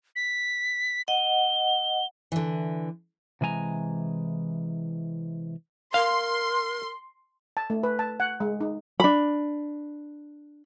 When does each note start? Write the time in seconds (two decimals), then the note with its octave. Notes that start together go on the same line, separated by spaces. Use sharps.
0.16 B6
1.08 D#5 F#5 G7
2.32 D3 E3
3.41 C3 E3 G#3 G#5 A#5
5.94 A#4 F5 C6
7.57 A5
7.70 A3
7.83 B4
7.99 A5
8.20 F#5
8.40 G#3
8.61 D#4
9.00 D4 B5